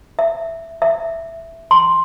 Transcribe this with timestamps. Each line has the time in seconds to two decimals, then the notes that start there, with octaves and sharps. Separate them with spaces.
0.19 E5
0.82 E5
1.71 C6